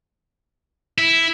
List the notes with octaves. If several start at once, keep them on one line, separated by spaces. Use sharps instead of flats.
E4